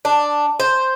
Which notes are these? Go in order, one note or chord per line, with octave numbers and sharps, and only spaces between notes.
D4
C5